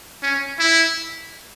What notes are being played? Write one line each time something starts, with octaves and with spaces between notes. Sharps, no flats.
C#4
E4